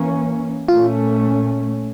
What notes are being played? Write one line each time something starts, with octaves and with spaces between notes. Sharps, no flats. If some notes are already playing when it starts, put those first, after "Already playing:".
Already playing: E3 A#3 C#4
A#2 A3 C#4 F4